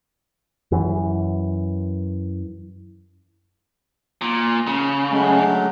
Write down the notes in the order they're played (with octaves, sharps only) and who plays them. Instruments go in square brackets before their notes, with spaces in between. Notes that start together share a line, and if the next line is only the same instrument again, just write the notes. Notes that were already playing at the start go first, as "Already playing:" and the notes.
[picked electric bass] F#2 E3
[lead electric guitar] A#2
C#3
[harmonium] F#3 G#3 A3